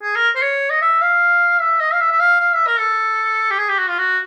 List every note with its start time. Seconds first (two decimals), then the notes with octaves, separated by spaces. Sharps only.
0.02 G#4
0.16 A#4
0.35 C5
0.42 C#5
0.70 D#5
0.82 E5
1.01 F5
1.61 E5
1.80 D#5
1.92 F5
2.00 E5
2.11 E5
2.20 F5
2.40 F5
2.54 E5
2.67 A#4
2.79 A4
3.51 G4
3.58 G#4
3.69 G4
3.79 F#4
3.89 F4
3.98 F#4